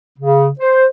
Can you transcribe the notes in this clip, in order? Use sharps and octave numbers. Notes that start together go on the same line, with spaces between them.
C#3
C5